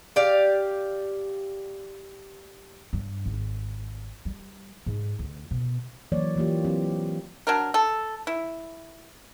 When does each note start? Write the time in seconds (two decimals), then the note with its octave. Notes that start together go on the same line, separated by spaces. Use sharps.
0.16 G4 D5 F5
2.93 G2
3.25 G#1
4.25 G3
4.86 G#2
5.19 D2
5.51 B2
6.12 E3 F#3 A#3 C#5 D5
6.36 E3 A#3 F4 G4
6.64 F#3 C4 G4
7.47 F#3 D4 A#4
7.74 A4
8.27 E4